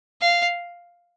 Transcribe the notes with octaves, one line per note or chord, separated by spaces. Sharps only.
F5